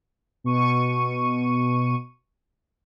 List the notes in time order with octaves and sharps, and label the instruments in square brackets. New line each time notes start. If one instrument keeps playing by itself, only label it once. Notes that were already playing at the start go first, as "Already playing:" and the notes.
[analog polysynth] B2 C#6 D#7